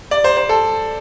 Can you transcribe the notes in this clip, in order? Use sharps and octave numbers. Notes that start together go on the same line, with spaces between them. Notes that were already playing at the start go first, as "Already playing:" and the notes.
D5
C5
C5
A4